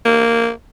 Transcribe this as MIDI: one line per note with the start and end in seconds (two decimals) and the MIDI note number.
0.06 0.51 58